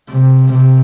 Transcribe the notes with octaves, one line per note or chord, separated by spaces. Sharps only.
C3
C3